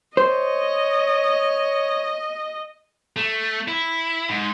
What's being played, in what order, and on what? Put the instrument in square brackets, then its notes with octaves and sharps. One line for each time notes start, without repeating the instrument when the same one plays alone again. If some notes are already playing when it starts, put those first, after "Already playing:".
[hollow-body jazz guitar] C5 [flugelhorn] C#5 [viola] D#5
[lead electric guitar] A3
E4
G#2